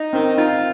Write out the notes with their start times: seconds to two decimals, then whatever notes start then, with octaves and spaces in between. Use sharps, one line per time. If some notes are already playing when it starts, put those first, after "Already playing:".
Already playing: D#4
0.13 D#3 C4
0.37 D#4 F4